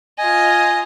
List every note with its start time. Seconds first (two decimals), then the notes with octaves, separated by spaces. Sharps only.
0.18 F4 D#5 G#5